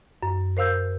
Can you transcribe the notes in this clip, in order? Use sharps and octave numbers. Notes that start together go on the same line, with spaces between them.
F#2
A#4 C5 F5 E6 G6